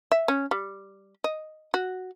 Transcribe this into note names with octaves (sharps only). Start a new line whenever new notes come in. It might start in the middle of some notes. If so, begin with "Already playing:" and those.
E5
C#4
G3
D#5
F#4